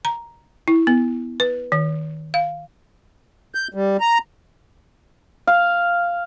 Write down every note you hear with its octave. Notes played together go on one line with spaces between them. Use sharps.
A#5
E4
B3
B4
D#3
F5
G6
G3
A#5
F5